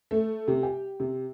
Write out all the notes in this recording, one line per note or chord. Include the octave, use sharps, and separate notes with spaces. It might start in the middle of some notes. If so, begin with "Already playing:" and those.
A3
C3
G4
C3